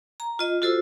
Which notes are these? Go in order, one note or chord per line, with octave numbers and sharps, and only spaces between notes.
A#5
F4 D#5
F4 F#4 A4 C5 E6